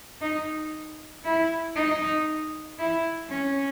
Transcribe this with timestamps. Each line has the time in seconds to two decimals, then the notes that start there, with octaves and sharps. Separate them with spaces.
0.21 D#4
1.25 E4
1.76 D#4
2.79 E4
3.30 C#4